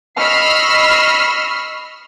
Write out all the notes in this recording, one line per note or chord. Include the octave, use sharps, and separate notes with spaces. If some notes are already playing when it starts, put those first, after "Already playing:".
D#5 B5 C#6 E6 F6 C7